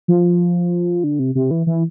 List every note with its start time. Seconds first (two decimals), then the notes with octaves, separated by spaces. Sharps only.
0.08 F3
1.04 D3
1.19 C3
1.35 C3
1.51 E3
1.67 E3